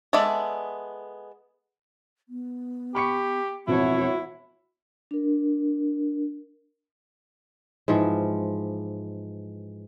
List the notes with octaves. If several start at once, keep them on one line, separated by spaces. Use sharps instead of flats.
G#3 B3 A4 D5 E5
B3
G4 B5 C#6 C#7
E1 F2 E4 F#4 C#5 E5
D4 A#4
G#2 E3 F3